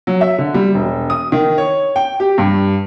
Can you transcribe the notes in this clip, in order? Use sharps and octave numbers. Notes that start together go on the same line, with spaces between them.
F#3
E5
D3
G3
E1
D#6
D#3
C#5
G5
G4
G2